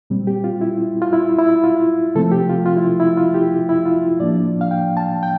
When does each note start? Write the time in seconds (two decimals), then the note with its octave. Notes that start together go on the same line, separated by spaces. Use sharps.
0.10 A#2 G3 C4
0.27 G4
0.44 F4
0.61 E4
1.02 F4
1.13 E4
1.38 E4
1.64 F4
2.15 C3 F3 A3 C4 A4
2.32 G4
2.49 F4
2.66 F4
2.77 E4
3.00 E4
3.17 F4
3.34 G4
3.69 E4
3.85 F4
4.20 A2 F3 A#3 D4 D5
4.61 F5
4.71 G5
4.97 A5
5.23 G5